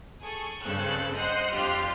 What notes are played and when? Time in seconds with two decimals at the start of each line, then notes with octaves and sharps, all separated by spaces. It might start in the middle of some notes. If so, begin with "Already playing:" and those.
0.23 G#4 A4 C#6
0.62 G2 C#3 C4 A4 F#6
1.14 C5 D#5 F#5 F#6
1.53 F2 D4 F4 G4 C6 F6